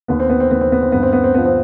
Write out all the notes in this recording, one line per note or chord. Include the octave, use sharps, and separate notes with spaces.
D#2 B3
C4
B3
C4
D#2 B3
C4
B3
C4
G2 B3
C4
B3
C4
F3 B3
C4